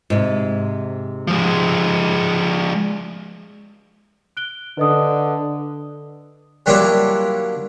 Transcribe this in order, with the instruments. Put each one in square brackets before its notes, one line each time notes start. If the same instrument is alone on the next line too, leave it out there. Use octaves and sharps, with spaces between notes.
[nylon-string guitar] G#2 C3
[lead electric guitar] F3 G#3
[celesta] F#6 D7 G7
[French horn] D3 [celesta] B4 D#5 D#6
[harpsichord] F#3 G3 A#3 D4 E4 F4